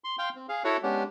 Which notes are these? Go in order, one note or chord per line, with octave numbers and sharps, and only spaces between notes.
C6
F5 G5 C6
C4
G#4 F5
E4 F#4 A4 C#5 F#5
G#3 B3 C#4 D4 G4